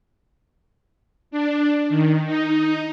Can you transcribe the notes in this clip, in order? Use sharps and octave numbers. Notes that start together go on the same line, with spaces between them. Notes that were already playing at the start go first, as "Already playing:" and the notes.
D4
D#3
D#4